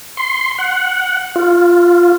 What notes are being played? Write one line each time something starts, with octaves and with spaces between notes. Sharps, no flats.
C6
F#5
F4